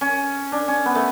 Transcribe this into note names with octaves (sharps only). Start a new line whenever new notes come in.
C#4
D4
C#4
B3
A3